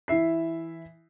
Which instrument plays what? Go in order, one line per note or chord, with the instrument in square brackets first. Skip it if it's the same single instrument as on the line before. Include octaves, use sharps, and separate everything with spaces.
[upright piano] E3 E4 E5 C7